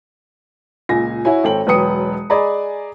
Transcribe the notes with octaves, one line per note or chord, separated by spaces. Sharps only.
C#2 A#2 G#5 A#6
E4 F#4 C#5 G#5
G#1 A4 C#5 G5 F#7
E1 F#3 B4 G5 D#6 C#7
G#4 D5 D#5 G#5 A#5 B5